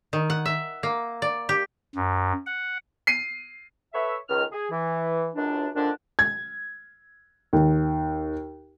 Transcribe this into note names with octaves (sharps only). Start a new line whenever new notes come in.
D#3
F#5
E5
A#3
D5
G4
F#2
F#5
C7 D#7
A4 B4 C#5 E5
C#2 D#3 F6
G#4
E3
C#2 F#2 D4
A#2 D3 D#3 F3 D4
G#6
D#2